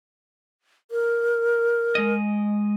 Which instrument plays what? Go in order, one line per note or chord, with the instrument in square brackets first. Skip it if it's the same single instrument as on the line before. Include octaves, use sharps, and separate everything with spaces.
[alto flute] A#4
[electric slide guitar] G#3 D#5